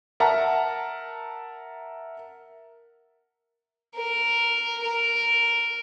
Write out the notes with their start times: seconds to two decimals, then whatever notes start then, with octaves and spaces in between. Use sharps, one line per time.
0.20 A#4 E5 F#5 A5 A#5
3.95 A#4
4.83 A#4